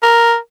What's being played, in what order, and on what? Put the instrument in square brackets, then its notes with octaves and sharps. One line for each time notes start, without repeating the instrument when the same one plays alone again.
[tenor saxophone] A#4